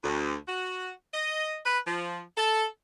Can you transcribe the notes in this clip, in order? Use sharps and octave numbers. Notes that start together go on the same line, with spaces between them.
D2
F#4
D#5
B4
F3
A4